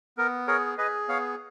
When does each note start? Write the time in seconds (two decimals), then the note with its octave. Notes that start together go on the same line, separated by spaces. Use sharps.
0.18 B3 A#4
0.47 G#4 A#4 C#5
0.78 G#4 B4 D#5
1.08 B3 C#5 F5